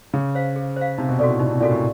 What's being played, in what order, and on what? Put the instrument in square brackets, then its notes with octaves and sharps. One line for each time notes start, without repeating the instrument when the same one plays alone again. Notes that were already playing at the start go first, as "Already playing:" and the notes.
[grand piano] C#3 [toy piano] G#4
[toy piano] C5 F5
G#4
C5 F5
[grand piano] C3 [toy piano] D#4
[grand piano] B2
[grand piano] B2 [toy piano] F#4 A4 D5
[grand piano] A2
[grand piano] B2 [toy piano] D#4
[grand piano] C3
[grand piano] A#2 [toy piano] F#4 A4 D5
[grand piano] A2